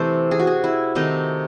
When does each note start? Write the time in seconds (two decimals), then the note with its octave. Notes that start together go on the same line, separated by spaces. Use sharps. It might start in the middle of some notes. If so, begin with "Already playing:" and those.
Already playing: C3 E3 A3 A4 C5
0.31 G#4
0.39 F#4
0.47 G#4
0.64 E4
0.95 C3 D#3 A3 D#4